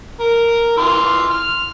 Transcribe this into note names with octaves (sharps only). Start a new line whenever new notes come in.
A#4
E3 C6 F6
F6